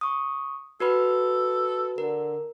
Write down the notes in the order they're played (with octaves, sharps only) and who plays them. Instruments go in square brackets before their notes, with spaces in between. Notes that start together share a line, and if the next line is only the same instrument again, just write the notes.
[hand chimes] C#6 D#6
[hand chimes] F#4 B4 B5 [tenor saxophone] A4
[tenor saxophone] D3 [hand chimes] A#4